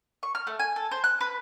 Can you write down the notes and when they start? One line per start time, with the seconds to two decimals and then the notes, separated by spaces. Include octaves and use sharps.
0.23 C#6
0.35 F6
0.47 A3
0.59 G#5
0.76 A4
0.91 C5
1.04 F#6
1.21 B4